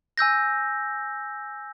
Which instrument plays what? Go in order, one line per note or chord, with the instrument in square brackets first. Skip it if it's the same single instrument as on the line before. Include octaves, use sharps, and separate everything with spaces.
[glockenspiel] G#5 E6 G6 A#6